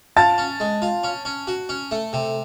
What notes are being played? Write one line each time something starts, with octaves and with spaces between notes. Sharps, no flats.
F4 A5 A6
C#4
G#3
F4
C#4
C#4
F#4
C#4
A3
C3